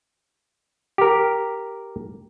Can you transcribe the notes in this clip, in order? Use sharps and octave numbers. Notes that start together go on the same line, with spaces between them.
G4 A#4